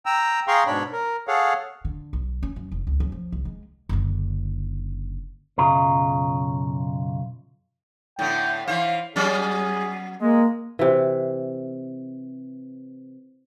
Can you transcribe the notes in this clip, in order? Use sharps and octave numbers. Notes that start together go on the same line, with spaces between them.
G5 A#5 E6
G#4 F5 G5 A#5 C6 C#6
G#2 B2 D4 C#5 B5
A#4
G#4 A4 C#5 F5 F#5
D3
B1
C#4
F#2
E1
C#2
F#2
F3
C2
G#3
F#1 D3
B1 F#2 C#3 F4 A#5
A2 D3 B3 G5
E3 C5 F5
F#3 B3 C#4 G#4
G#3 A#3
C3 E3